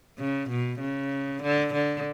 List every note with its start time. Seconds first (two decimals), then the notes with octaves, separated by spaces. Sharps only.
0.19 C#3
0.50 B2
0.80 C#3
1.43 D3
1.74 D3